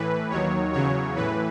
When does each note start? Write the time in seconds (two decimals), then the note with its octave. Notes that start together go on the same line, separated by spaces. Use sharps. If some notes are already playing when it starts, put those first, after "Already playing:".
Already playing: A2 E3 B4
0.30 D#2 D#3 F#3 C#5
0.73 E2 C#3 F#3 C#5
1.16 A2 E3 B4